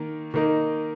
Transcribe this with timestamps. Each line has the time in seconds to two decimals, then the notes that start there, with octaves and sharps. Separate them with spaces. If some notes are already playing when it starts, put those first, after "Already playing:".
Already playing: D#3 A#3
0.34 D#3 A#3 D#4